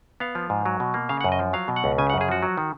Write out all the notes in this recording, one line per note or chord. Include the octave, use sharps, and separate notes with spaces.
B3 F5
F3
G#2
F#3
B2
A#3
C#3 F5
F#5
F#2
D#5
F3
F#3 F5
B2
F#5
C#2
C#3 G#5
F#5
F#2
G#4
F3 F#4
F#3
D#3